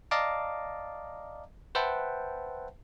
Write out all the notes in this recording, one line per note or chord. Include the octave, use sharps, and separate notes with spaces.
D5 D#5 F5 A5 A#5 D6
B4 C5 E5 F#5 G5 A5